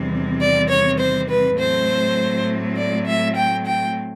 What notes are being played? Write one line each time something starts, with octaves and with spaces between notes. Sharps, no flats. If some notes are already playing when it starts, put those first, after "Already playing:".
Already playing: E2 C3 D#3 G3 C4
D5
C#5
C5
B4
A2 F#3 A3 C4 C5
D5
E5
G5
G5